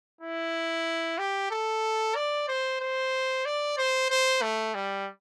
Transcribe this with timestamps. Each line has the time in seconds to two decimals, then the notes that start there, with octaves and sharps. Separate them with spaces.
0.21 E4
1.18 G4
1.51 A4
2.16 D5
2.48 C5
2.80 C5
3.45 D5
3.77 C5
4.10 C5
4.42 A3
4.75 G3